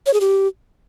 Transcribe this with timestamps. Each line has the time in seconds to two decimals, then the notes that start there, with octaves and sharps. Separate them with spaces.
0.06 C#5
0.14 G#4
0.21 G4